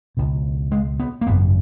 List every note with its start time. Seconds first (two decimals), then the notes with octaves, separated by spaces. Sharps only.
0.17 C#2 B2
0.72 G#3
0.99 B3
1.21 A#3
1.27 G#1 F#2 C#3 B3